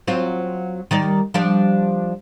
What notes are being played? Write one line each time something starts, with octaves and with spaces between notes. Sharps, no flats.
F#3 C4 F4
D#3 G3 D5
F3 G3 D4